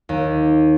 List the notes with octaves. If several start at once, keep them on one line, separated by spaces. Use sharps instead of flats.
D#2